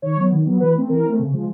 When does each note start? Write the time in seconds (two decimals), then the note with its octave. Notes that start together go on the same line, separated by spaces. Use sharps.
0.02 D#3 C#5
0.17 F#3 B3
0.31 D#3
0.46 F#3 B3
0.60 E3 B4
0.74 A3 C4
0.89 E3 A#4
1.05 A3 C4
1.19 C#3
1.33 F3 G#3